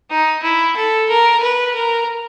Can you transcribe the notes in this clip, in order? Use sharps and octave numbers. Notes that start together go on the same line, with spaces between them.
D#4
E4
A4
A#4
B4
A#4